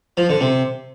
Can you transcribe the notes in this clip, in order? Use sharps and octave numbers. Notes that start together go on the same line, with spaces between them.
F3
D3
C3